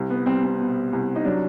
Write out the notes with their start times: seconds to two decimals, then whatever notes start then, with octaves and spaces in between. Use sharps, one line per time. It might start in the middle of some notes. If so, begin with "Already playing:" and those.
Already playing: C2
0.10 B3
0.26 G3 C4
0.43 C4
0.59 B2
0.93 C2
1.16 D#4
1.25 F#3 D4